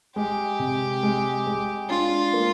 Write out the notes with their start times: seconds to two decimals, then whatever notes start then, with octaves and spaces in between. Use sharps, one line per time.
0.16 G#3 G4
0.59 C3
1.03 G#3
1.47 G#3
1.90 D4 F4
2.34 A#3